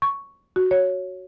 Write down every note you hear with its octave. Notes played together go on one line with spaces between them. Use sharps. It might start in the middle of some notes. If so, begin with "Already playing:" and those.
C#6
F#4
C#5